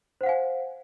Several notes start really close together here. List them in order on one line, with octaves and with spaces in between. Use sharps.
C5 F#5 F5 G#5